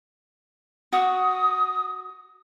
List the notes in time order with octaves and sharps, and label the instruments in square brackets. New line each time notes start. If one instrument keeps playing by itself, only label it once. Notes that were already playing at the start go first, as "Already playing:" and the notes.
[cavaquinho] F#4 [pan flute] D#6